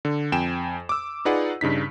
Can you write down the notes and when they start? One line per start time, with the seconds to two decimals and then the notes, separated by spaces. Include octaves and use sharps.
0.05 D3
0.32 F2 G5 G#5 E7
0.89 D6 E6
1.25 D#4 F4 G#4 B4 D5 F#5
1.61 G2 C#3 D#4 B6